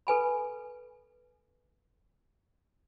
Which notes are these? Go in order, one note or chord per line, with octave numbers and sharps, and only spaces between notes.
A4 B4 G#5 B5